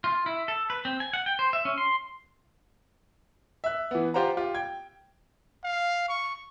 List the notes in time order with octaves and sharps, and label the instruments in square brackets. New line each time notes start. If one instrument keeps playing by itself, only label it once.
[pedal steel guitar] F4
E4
A4
B4
C4
G#5
F#5
G5
C5
E5
C#4
C6
[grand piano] E5 F#6
E3 B3
F4 G4 C5 F#5 A#5
F4 G4
G5 G#6
[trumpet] F5
C#6